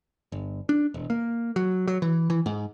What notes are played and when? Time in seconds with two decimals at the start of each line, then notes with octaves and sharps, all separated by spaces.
0.32 G1
0.69 D4
0.94 E1
1.10 A#3
1.56 F#3
1.87 F#3
2.02 E3
2.30 E3
2.46 G#2